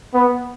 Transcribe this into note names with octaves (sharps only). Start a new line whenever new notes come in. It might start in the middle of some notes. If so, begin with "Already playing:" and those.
B3